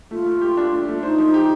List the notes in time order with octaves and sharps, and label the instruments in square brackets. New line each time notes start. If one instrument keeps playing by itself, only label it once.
[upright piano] A3 [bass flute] F4
[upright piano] A3
G4
D4
A3
A3
[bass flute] D#4 [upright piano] C5
[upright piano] F3
G4